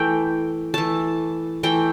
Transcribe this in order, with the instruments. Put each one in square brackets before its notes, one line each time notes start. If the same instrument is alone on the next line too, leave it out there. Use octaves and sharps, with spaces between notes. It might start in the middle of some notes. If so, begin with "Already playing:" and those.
Already playing: [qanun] E3 A3 G5
E3 A3 A5
E3 A3 G5